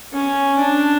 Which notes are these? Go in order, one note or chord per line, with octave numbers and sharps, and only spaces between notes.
C#4
D4